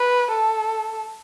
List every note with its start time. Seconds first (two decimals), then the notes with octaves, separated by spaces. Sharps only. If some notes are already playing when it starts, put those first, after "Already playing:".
Already playing: B4
0.31 A4